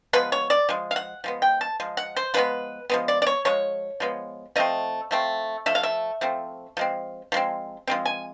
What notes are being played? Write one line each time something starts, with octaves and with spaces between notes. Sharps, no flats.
F3 G#3 B3 B4
C#5
D5
F3 G#3
F5
F#5
F3 G#3 B3
G5
A5
F3 G#3
F#5
C5
F3 G#3 B3 B4
F3 G#3 B3
D5
D5
C#5
F3 G#3 C#5
F3 G#3 B3
F3 A3 C4 D#5
F3 A3 C4
F3 A3 E5
F5
E5
F3 A3 C4
F3 G#3 C4
F3 G#3 C4
F3 G#3 C4
G#5